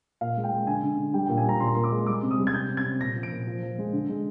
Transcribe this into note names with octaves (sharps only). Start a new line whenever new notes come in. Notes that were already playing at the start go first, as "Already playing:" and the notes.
A#2 F5
G#3
G5
G#3
D3 G#5
D3
D3
G3 G5
G5
A#2
G#5
G3 A#5
A#2 C6
A#5
A#2 C6
D6
G#3
G3 D6
C3
D#6
G3
G#6
C3 G6
C3
G#6
C3
A#2 A#6
F3
D7
A#2
F3
F3
G#3
D3
G#3